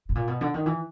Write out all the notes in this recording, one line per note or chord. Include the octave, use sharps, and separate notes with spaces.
A2
A#2
B2
D3
D#3
E3